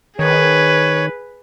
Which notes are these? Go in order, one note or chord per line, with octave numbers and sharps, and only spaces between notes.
D#3 G#4 B4 C#5